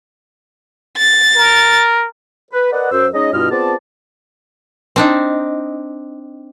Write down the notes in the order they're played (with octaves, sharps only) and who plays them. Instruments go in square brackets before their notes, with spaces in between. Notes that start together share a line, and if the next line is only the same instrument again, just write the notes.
[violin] A6
[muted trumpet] A#4
[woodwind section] B4
A#4 B4 D5 D#5 F#5
F#2 C5 E6
G#3 C#4 D#4 D#5
G2 B2 E4 F4 D#5 F6
B3 C4 F4 G#4 D5 A5
[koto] C4 D4 D#4